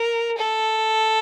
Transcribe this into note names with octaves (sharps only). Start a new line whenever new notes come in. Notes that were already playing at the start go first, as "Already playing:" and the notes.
Already playing: A#4
A4